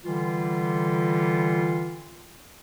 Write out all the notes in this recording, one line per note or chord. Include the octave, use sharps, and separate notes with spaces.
D3 E3 G3 F4